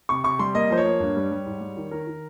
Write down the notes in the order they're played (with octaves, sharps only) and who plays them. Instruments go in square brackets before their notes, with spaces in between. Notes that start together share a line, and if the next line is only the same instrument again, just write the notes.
[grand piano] C3 C#6
C3 C#6
G3 C6
A#3 D#5
F3 C5
C#5
A#3
G2
G3
G3
G#2
G3
D#3
D#3 A#4
D#3